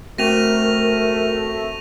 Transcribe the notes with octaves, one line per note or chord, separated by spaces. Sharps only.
A3 C4 F#4 A#4 A#6 D#7 F7